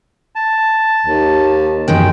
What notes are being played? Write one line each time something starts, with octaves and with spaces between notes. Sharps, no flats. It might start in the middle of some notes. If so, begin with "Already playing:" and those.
A5
D#2
F#2 B2 D#3 G#3 D#4 G5